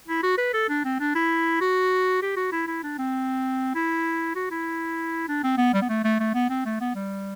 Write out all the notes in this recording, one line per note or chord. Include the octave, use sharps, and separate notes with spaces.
E4
F#4
B4
A4
D4
C4
D4
E4
F#4
G4
F#4
E4
E4
D4
C4
E4
F#4
E4
D4
C4
B3
G3
B3
A3
A3
A3
B3
C4
A3
B3
G3